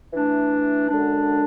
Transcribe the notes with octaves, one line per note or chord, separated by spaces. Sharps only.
E3 A3 D4
F#2 D3 G#3 D4